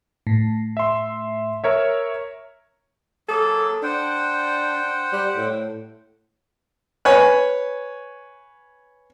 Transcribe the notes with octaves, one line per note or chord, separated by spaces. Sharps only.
A2
E5 C6
A#4 C#5 E5
F#3 A#3 G#4 A4
D4 C5 F#5 G5
G3
A2
B4 C#5 G#5